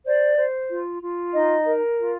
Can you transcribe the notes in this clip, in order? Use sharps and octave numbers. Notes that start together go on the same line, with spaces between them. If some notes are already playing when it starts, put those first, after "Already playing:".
C5 D5
C5
F4
F4
D#4 D#5
A#4
F4